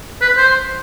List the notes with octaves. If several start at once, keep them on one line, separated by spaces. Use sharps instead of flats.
B4
C5